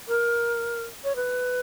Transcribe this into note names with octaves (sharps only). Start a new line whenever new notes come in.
A#4
C#5
B4